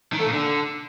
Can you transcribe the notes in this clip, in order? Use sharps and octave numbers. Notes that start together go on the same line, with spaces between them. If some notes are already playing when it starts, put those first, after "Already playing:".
D#3
A3
A#2
D3